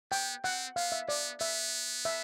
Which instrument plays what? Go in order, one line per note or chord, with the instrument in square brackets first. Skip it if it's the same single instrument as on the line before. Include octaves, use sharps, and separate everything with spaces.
[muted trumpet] B3 [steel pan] G5
[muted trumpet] C4 [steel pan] F#5
[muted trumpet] B3 [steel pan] F5
[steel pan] E5
[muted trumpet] B3 [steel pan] D5
[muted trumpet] B3 [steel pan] E5
[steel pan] E5